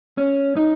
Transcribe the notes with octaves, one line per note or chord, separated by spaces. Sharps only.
C#4
D#4